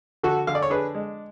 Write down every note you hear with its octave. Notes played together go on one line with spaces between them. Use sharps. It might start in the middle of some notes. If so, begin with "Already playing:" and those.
D3 F#4 A4
D3 F5
D5
C#5
D4 G#4 B4
G#3